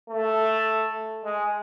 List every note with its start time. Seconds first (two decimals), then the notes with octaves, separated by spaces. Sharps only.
0.09 A3
1.24 G#3